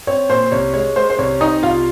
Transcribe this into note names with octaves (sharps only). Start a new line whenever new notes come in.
C4 C#5
A#2 C5
C2 C#5
G#3 C#5
G#3 C5
C5
C2 C#5
C4 D#4 D#5
C2 F4 F5